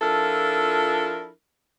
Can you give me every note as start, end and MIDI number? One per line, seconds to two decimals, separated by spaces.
0.02 1.30 53
0.02 1.30 62
0.02 1.30 64
0.02 1.30 65
0.02 1.30 69
0.02 1.30 70